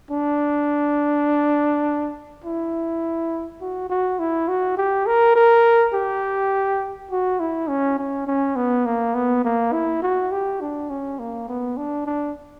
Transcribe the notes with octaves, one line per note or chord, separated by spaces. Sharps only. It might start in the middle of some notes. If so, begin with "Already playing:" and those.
D4
E4
F#4
F#4
E4
F#4
G4
A#4
A#4
G4
F#4
E4
C#4
C#4
C#4
B3
A#3
B3
A#3
E4
F#4
G4
D4
C#4
A#3
B3
D4
D4